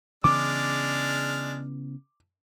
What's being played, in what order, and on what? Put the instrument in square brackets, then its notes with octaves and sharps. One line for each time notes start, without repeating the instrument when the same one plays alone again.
[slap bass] C#3 E3 B3 [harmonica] G#3 D4 F6 [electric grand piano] D6